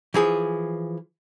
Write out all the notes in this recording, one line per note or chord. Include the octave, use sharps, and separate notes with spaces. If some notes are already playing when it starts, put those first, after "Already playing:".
E3 F3 G#4